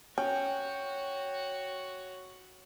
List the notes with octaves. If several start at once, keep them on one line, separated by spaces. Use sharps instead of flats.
C#4 F#4 C#5 G5